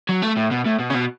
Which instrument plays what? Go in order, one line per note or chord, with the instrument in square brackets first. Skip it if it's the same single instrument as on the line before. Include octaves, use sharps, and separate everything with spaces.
[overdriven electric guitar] F#3
A3
A2
B2
A2
B2
C#3
B2